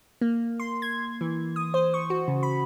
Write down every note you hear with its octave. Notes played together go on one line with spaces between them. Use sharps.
A#3
C6
G#6
E3
D#6
C5
C#6
F#4
C#3
B5